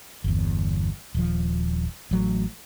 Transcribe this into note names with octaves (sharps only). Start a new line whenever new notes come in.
G1 E2
D#1 F3
A1 F#3 A3